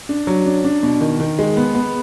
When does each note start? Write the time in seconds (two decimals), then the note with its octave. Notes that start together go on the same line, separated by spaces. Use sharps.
0.09 D4
0.27 F#3
0.46 D4
0.64 D4
0.83 B2
1.01 D#3
1.20 D#3
1.39 G#3
1.57 B3
1.75 B3